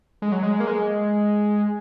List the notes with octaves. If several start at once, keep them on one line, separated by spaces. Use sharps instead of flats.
G#3
F#3
G#3
A#3
G#3